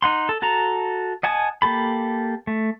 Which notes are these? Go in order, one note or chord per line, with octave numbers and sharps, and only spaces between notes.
D#4 F#5 C6
A4
F#4 A4 A5 A#5
D#5 F#5 G#5 A5 D#6
A#3 G4 A4 B5
A3